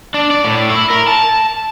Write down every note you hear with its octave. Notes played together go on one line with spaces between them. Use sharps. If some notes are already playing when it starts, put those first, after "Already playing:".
D4
D5
A2
E4
A#4
A5